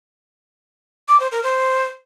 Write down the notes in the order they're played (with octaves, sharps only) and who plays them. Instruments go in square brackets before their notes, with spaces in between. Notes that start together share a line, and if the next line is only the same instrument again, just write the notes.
[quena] D6
C5
A#4
C5